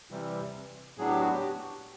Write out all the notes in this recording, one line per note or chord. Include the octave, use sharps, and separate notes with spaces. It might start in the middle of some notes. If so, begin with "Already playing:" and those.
C3 E3 G3
A2 F#3 B3 D4 G#4
G4
F#4
G4